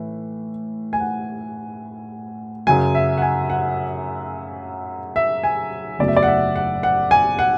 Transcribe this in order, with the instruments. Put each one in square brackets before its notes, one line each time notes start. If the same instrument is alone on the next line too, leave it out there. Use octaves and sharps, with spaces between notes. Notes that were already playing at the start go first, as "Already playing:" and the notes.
Already playing: [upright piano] A2 E3
G#5
F#5
F#2 C#3 F#3 G#5
E5
F#5
G#5
F#5
E5
G#5
F#1 E2 C#3 F#3 A3 D5
E5
D5
F#5
E5
F#5
F#5
G#5
F#5